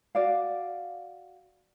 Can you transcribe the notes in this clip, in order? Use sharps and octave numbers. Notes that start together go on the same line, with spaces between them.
F#4 D5 F5